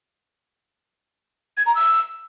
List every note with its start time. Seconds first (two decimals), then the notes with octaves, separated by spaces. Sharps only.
1.57 G#6
1.66 A#5
1.75 E6